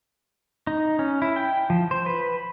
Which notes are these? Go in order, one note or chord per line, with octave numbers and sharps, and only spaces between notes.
D#4
C#4
E4
G5
F3
C5
B4